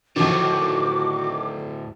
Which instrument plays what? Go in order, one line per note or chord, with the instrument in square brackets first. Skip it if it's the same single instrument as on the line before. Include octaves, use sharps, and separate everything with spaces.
[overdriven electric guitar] D2 A2 [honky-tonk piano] D#3 F3 [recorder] F#4 [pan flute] D6